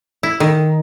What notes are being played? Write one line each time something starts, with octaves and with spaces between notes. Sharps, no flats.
E4
D#3